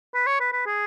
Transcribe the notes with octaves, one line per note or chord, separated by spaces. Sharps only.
B4
C#5
B4
B4
G#4